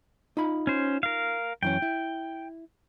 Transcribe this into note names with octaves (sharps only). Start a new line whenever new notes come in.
D#4 F4 B5
C#4 C5
A#4 F5
F#2 E3 C#4 G5
E4